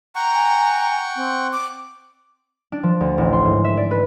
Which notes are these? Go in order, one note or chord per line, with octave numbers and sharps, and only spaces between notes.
F#5 G5 A#5 C#6
G#5
C4
D6
D4
F3
D2
A1
C6
G#2
E5
D5
B4